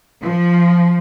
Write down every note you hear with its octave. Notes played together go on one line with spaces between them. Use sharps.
F3